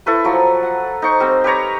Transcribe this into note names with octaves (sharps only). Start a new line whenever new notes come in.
E4 A4 B4 C#6
F3 F#3 C#6
F#5
D#4 C5 C#6
G3 C4
G4 B4 C#5 A#5